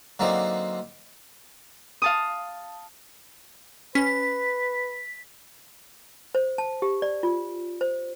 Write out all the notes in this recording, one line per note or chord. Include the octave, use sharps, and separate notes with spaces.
D3 F#3 A#3 C4 D#4
F5 A5 D#6
C#4 B4 B6
C5
A5
G4
D5
F4
C5